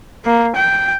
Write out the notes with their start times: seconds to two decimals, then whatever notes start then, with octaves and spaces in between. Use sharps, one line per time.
0.25 A#3
0.56 G5